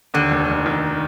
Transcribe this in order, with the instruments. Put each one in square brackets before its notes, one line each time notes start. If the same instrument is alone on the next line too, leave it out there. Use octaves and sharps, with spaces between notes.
[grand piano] D#2 [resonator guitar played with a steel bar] D3
[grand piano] F1
F1
D#3